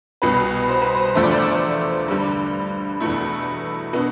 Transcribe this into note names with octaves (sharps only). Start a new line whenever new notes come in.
C2 B2 B3 B4
C5
B4
C5
E2 D3 F3 A3 E5
D5
C5
D5
G2 D3 G3
E2 B2 A3 E4
B2 B3 D4